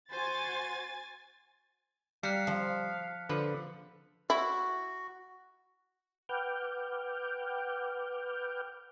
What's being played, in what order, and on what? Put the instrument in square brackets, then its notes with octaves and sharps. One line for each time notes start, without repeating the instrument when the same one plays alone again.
[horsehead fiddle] F#4 C5 [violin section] G#5 A6
[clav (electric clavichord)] G3 [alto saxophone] F5 [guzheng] A#5 [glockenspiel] F#6 B6 C#7
[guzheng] F3
[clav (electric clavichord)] D3 F3 B4
[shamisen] E4 [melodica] F#4
[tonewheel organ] B4 F#5 G5 D6 F6 G6